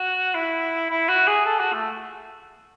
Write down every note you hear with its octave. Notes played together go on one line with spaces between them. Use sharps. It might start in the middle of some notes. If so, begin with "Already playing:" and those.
Already playing: F#4
E4
E4
F#4
G#4
A4
F#4
A3